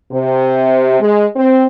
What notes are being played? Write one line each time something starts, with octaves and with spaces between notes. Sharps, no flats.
C3
G#3
C4